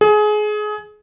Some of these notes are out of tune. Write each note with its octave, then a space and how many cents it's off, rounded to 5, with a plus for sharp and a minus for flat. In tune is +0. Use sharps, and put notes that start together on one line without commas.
G#4 +25